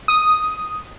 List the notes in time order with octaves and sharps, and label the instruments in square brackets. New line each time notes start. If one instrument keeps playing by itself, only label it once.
[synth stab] D#6